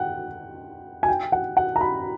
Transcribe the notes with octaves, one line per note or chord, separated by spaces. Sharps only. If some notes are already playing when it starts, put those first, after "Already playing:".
Already playing: F#5 G5
G#5
G5
F#5
F#5
A#5
B5